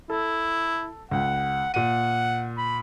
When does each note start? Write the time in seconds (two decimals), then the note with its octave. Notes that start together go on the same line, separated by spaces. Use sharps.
0.10 E4 A4
1.11 C#2 F#5
1.74 A#2 F#5 D#7
2.57 B5